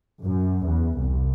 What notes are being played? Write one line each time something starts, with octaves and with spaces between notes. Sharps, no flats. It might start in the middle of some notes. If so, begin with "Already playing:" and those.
F#2
E2
C2